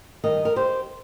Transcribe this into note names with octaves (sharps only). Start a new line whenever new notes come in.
G2 D#3 G3 A#4 D#5
A#4
G4 C5